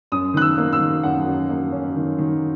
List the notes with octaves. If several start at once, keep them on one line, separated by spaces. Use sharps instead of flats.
F#2 D#6
D#3 F#6
E6
A#3
E6
D#3
F#2 F#5
F#2
A#3
C#4
D#3
D#3